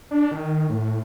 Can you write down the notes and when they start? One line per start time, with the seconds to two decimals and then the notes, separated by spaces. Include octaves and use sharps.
0.11 D4
0.31 D#3
0.70 A2